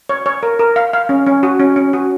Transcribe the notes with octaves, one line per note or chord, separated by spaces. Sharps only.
C#5
C#5
A#4
A#4
F5
F5
C#4
C#4
F#4
C#4
C#4
F#4